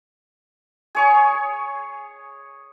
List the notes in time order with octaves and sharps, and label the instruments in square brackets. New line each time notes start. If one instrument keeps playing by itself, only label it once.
[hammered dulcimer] G#4 C#5 C#6